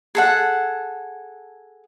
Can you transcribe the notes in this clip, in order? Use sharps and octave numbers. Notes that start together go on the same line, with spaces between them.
G#4 A4 F#5